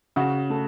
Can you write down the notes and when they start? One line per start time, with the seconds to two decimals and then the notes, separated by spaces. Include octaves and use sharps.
0.16 C#3 F#4
0.50 A3